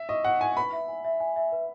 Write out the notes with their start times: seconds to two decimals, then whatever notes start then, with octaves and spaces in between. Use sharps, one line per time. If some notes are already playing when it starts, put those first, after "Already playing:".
Already playing: E5
0.09 D#5 C#6
0.25 F#5 C#6
0.40 G#5 C#6
0.57 B4 B5
0.73 E5
0.88 G#5
1.05 E5
1.20 G#5
1.36 E5
1.52 B4